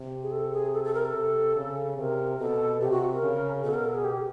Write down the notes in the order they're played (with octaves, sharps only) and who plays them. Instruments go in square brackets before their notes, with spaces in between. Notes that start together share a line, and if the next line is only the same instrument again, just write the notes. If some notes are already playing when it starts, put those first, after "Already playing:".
Already playing: [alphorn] C3
[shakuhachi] G#4
A4
G#4
A4
A4
A#4
A4
[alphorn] C3
C#3
[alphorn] C3 [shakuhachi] A#4
[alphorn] B2 [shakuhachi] A4
[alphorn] C3 [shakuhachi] G4
[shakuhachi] F#4
A#4
[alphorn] C#3
[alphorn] B2 [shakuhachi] A4
[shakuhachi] A#4
A4
G#4
G4